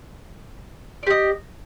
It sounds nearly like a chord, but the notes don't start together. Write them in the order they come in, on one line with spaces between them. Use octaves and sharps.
D5 G4 D#5